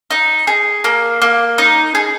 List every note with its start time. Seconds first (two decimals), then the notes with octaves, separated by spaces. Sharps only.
0.11 D#4
0.47 G#4
0.84 A#3
1.22 A#3
1.58 D#4
1.95 G#4